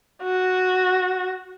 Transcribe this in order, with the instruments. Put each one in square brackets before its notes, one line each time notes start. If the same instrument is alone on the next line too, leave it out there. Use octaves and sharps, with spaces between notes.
[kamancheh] F#4